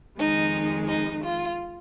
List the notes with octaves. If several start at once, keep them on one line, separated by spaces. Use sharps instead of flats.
F2 D#3 G#3 D#4
D#4
F4